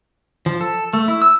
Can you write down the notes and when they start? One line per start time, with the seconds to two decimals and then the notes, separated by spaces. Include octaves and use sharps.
0.46 F3
0.61 A4
0.93 A3
1.08 E4
1.22 E6